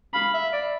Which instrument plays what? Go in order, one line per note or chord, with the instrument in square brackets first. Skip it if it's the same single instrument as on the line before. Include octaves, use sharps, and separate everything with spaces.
[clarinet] F5 [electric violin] B5
[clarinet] E5
D5